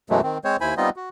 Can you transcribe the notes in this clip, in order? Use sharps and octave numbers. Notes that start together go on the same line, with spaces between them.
F#2 B2 E3 F#3 G#3 A3
D#3 C4
G#3 C4 C5 C#5
D#2 E4 C5 G#5 B5
G3 B3 C4 D#4 F4 D#5
F#4